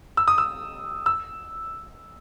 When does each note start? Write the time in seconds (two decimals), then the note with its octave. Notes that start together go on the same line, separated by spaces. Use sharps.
0.17 E6
0.28 D#6
0.38 E6
1.06 E6